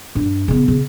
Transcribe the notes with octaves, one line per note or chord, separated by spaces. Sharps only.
G2
C#3 B3
C#3